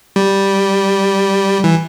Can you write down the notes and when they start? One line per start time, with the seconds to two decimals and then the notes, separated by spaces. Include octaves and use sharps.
0.16 G3
1.64 E3